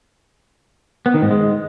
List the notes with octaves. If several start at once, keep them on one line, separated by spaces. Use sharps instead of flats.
B3
D#3
G#2
G#3